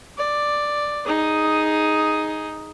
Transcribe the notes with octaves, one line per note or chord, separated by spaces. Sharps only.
D5
D#4 G#4